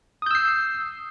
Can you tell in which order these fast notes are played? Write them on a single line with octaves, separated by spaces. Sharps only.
D#6 G6 E6 C7